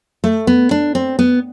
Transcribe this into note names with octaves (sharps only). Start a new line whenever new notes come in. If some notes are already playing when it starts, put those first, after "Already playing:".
A3
B3
D4
C4
B3